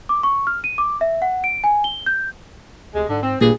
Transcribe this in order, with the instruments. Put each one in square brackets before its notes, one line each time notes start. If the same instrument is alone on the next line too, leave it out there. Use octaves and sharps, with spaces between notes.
[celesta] D6
C#6
F6
D#7
D6
E5
F#5
D7
G#5
G7
G6
[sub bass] D2 [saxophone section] C3 G#3
[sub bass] G#2 [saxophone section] D3
[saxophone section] C4
[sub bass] G#1 [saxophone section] G2 [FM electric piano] A#2 [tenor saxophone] G#4